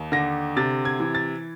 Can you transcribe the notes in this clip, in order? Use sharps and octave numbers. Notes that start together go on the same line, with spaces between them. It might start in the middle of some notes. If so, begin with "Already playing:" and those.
Already playing: D#2
D3 A#6
C3 A6
G#6
E3
A6